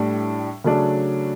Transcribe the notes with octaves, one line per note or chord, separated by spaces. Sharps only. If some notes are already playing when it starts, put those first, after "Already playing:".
Already playing: A2 G3 D4 A4
C#3 F#3 A3 D4